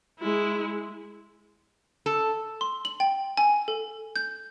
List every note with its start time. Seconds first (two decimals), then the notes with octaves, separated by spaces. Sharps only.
0.20 G#3 E4
2.06 A4
2.61 C6
2.85 F#7
3.00 G5
3.37 G#5
3.68 A4
4.16 G6